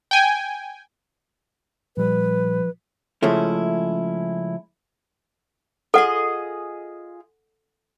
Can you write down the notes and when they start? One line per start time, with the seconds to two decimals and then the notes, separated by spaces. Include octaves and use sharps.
0.11 G5 G#5
1.97 A#2 F3 G3 B4
3.22 C#3 F3 G#3 A3 C#4 E4
5.94 F4 G#4 A4 D#5 F#5